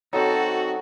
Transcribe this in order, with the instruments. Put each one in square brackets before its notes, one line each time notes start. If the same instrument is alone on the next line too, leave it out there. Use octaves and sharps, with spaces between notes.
[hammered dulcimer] F#3 [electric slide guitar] C4 D#4 [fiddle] F#4 [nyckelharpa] A4